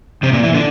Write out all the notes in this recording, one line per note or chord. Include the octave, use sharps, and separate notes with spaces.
C3 C4
A#2 A#3
E3 E4
D3 D4